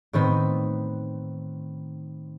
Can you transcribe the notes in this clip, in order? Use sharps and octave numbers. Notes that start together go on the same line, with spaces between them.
A2 D#3 B3 C4